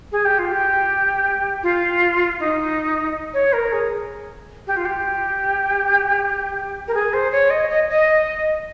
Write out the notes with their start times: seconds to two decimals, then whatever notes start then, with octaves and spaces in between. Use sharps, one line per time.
0.12 G#4
0.25 G4
0.39 F4
0.52 G4
1.63 F4
2.40 D#4
3.34 C#5
3.53 A#4
3.72 G#4
4.67 G4
4.76 F4
4.85 G4
6.88 A#4
6.94 G#4
7.13 C5
7.32 C#5
7.50 D#5
7.70 D#5
7.89 D#5